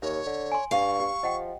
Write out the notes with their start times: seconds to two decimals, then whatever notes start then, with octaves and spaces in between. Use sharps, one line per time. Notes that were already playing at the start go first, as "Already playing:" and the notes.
0.02 D#2 C#5 E5
0.26 D3
0.52 G#5 C6
0.71 G2 F5 C#6
1.00 G4
1.23 F3 D#5 F#5 G5